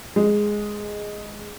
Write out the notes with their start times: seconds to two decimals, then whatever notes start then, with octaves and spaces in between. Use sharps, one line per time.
0.16 G#3